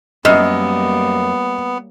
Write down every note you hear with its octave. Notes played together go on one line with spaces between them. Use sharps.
F#2 G3 A#3 B3 D#5